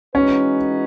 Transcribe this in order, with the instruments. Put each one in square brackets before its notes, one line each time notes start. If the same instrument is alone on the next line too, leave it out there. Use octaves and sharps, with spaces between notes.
[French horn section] E3 G#3 D#4 F#4 B4 [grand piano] C#4